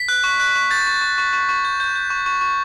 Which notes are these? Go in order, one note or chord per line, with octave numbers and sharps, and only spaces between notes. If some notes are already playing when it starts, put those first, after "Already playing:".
Already playing: B6
F#6
C#6
F#6
C#6
G6 A6
C#6
C#6
C#6
C#6
C#6
G6
G6
G6
C#6
C#6
C#6